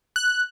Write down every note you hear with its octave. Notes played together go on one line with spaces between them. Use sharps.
F#6